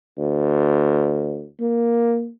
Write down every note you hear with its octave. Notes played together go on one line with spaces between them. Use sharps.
D2
A#3